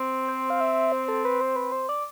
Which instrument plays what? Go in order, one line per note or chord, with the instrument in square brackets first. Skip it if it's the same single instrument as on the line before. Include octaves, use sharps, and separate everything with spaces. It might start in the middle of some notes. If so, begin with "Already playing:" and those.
Already playing: [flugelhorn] C4
[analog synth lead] C5
F5
E5
C5
A4
B4
C5
B4
C5
D5